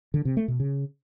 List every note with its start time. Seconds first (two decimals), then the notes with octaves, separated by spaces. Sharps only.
0.14 D3
0.25 C3
0.37 A3
0.48 B2
0.60 C#3